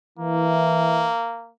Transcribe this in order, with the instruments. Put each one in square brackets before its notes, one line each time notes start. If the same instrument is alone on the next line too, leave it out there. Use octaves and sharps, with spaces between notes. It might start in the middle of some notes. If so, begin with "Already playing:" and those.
[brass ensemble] E3 [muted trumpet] A#3